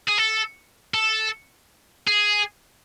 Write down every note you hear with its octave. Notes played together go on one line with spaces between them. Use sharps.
G#4
A4
A4
G#4